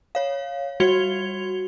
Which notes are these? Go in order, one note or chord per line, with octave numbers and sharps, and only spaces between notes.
C#5 F5
G3 F#4 G#6 C#7 F7 G7